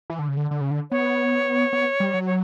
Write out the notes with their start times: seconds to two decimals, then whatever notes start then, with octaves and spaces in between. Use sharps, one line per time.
0.10 E3
0.19 D3
0.28 C#3
0.37 D3
0.51 D3
0.61 C#3
0.71 D3
0.91 B3 C#5
1.73 B3
2.00 G3
2.14 F#3
2.26 C#5